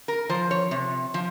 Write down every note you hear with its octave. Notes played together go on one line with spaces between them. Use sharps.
A#4
F3 C5
C#5
C3
F3